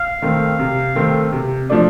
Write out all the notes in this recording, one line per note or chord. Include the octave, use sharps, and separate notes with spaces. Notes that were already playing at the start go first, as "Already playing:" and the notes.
Already playing: F5
D#3 A3 C4
C3
D#3 A3 C4
C3
F3 A3 D4